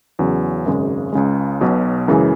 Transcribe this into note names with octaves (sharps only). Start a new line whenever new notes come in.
E2 C#3 F#3
G#1 F#2 C#3 G#3
C#2 C#3 G#3
B1 B2 F#3
F#2 C#3 E3 G#3